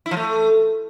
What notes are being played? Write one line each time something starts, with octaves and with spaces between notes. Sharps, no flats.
E4
F3
A3